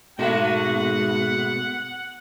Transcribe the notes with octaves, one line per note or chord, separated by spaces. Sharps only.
G#2 B2 G#3 A3 F#4 F#5